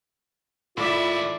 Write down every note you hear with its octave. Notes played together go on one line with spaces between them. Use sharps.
A2 D#3 F4 D5 E5 B5 D6